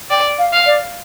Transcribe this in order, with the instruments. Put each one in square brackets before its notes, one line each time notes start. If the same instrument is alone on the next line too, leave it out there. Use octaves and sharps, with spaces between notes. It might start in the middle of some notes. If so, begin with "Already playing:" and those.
[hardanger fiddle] D5 [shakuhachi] G5
[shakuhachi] F5
[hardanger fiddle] F5
[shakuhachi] D5